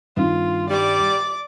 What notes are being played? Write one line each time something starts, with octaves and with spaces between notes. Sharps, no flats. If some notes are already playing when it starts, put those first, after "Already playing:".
G2 D#3 C4 F4
G3 D5 D6